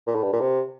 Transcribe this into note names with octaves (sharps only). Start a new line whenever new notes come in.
A#2
A2
G2
A#2
C3